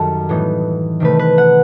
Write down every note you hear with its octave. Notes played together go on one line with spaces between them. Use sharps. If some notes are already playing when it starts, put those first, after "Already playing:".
Already playing: F#2 D#3 G3 A4
A2 E3 B3 D#4
C3 D#3 A3 B4
B4
F#5